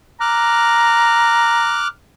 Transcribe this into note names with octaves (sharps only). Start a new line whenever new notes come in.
A#5 D6 F6 F#6